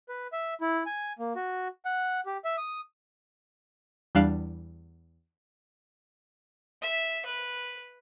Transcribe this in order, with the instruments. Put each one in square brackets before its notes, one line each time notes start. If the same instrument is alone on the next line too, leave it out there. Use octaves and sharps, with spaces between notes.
[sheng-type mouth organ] B4
E5
E4
G#5
A#3
F#4
F#5
G4
E5
D#6
[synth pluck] E2 G3 D4 F5 F#6
[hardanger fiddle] E5
B4